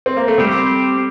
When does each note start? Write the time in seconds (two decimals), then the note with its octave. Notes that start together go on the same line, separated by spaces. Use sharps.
0.06 C4
0.17 A#3
0.28 A3
0.38 G3 C4 G4 C5